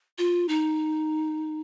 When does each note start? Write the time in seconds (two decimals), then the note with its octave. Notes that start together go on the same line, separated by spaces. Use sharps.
0.18 F4
0.49 D#4